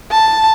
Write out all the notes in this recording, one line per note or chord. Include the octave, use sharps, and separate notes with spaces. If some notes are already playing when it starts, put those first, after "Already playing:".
A5